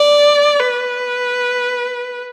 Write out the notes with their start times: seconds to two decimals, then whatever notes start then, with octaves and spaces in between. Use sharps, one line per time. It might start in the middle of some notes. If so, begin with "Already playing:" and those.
Already playing: D5
0.60 B4